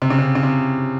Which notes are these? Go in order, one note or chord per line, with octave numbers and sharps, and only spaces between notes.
C3
C#3
C3
C#3
C3